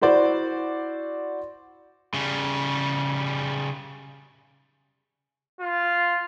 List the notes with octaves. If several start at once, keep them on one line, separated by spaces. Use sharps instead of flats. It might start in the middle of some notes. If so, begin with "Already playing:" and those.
E4 F#4 C5 D5
C#3 G3
F4